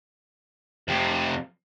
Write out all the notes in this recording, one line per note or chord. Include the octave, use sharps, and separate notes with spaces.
F2 C3